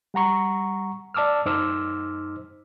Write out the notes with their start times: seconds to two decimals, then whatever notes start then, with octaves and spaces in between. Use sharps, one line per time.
0.14 G3 F#5 A#5 C#6
1.14 D5 A5 D6 E6 F6
1.45 F#2 D#4 C5 D6 E6 F6